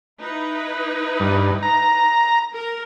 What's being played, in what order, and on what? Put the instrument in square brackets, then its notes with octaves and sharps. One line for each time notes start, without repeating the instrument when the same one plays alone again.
[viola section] D#4 E4 B4
[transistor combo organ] G2
A#5
[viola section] A#4